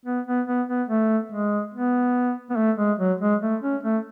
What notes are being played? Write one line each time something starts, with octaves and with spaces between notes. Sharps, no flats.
B3
B3
B3
B3
A3
G#3
B3
B3
A3
G#3
F#3
G#3
A3
C#4
A3